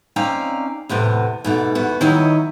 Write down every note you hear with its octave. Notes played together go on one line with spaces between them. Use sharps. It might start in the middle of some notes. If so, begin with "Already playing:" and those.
C4 C#4 D#4 D5 F5 A#5
E2 A2 C3 B3
G#2 B2 A3
E2 B3 F#4
D#3 F#3 E4 C#5 D#5